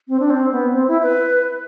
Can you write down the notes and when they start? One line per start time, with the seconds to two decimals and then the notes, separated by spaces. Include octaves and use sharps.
0.09 C4
0.20 D4
0.30 C4
0.52 B3
0.73 C4
0.88 E4
1.03 B4